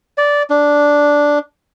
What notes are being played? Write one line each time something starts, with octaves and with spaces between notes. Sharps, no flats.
D5
D4